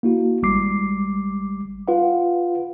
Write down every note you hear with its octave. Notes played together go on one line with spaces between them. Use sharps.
A#3 E4 F#4
G#1 G3 G#3 D6 C7
F4 B4 F5 F#5